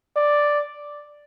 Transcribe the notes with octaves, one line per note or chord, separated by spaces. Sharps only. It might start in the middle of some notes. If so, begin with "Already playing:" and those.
D5